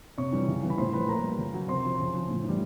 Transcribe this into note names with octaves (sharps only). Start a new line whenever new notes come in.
C3 C#5 C#6
E3 G3
C#3
E3 G3
B5
A2 C5 C6
F3 B4 B5
A#2 A#4 A#5
G3
C#3
F#3
C3 C5 C6
F3
C#3
F3
A2
E3 G3